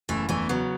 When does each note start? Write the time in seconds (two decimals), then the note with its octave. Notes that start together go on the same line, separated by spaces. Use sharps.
0.09 F#1 E3 A3
0.29 E2 E3 A3
0.49 C#3 F#3 B3